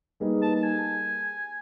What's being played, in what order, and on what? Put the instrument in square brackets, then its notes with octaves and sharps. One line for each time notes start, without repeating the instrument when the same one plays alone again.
[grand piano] G3 A#3 D#4 G#4 B4
[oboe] A5
A5
G#5